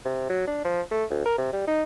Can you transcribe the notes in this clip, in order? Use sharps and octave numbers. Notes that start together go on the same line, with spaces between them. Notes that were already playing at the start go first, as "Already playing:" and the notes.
C3
F#3
D4
F3
A3
D2
A#4
C3
G3
D#4